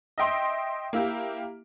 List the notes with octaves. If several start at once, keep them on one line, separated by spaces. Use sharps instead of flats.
D#5 E5 G5 C6
A#3 E4 G4